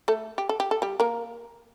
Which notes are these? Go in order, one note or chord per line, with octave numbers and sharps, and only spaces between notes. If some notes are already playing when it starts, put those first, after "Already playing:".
A3 A4
G4
A4
G4
A4
G3 G4
A#3 A#4